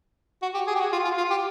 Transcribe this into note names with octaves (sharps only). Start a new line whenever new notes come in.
F#4
G4
G#4
G4
F#4
F4
F4
F4
G4